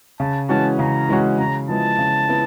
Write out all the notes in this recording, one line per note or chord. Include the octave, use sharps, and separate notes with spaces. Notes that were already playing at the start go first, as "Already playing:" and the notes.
C#3 A5
E3 G#3 C#4 F#4 A5
C#3 A#5
E3 G#3 C#4 F#4
C#3 A#5
F3 G#3 B3 E4 A5
C#3
B3 E4